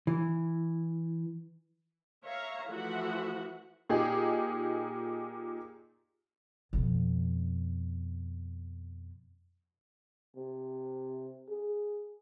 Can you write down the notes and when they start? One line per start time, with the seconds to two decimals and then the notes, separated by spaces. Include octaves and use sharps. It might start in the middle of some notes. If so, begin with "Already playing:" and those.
0.07 E3
2.24 C#5 E5 F5 A#5
2.69 E3 F3 A3 F#4 E5 F#5
3.89 A#2 D#4 G4 G#4
6.73 F2 B2
10.37 C3
11.50 G#4